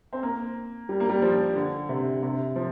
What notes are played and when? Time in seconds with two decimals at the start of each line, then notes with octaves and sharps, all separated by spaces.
0.13 C4
0.23 A#3
0.89 G3
1.00 A#3
1.09 G3
1.22 F3
1.56 D3
1.89 C3
2.23 C3
2.56 F3